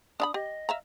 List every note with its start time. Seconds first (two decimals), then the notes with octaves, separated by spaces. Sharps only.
0.20 D4 F5 B5 D#6
0.34 G4 D#5
0.69 E5 F5 A#5